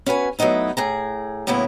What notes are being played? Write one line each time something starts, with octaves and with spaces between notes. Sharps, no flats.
C#4 F#4 B4 G#5
F#3 A3 B3 D#4 E4
A2 G#4 A#5
A2 C#3 F#3 A#3 B3 E4